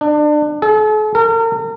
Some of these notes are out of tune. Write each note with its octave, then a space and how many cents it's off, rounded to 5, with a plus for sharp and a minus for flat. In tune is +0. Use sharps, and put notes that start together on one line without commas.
D4 +30
A4 -45
A#4 -40